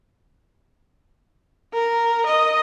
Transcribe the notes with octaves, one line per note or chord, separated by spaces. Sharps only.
A#4
D#5